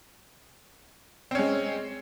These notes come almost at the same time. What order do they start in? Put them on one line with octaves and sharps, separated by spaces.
C4 C#4 G#3